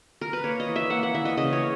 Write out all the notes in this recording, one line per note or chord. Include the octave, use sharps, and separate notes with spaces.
A#4
B4
A#3 C#5
D#5
E3
E5
A#3 F#5
F#5
E3 E5
D#5
C#3 D#5
C#5